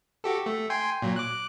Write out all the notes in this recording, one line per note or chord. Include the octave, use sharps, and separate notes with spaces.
F#4 G4 A4
A3
G5 G#5 C6
A#2 F#3
D6 F#6